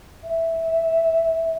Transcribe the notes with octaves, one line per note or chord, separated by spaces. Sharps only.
E5